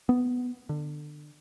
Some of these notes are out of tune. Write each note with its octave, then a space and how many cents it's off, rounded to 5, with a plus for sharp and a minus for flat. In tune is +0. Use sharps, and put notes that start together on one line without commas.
B3 +5
D3 +25